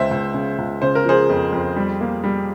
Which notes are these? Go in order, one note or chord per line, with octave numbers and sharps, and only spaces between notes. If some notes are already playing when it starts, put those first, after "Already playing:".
Already playing: C#2 C5 E5
C#2
C#3
C#2
C#3 C5
A#4
F3 G#4 C5
F2
F2
G3
A#3
G3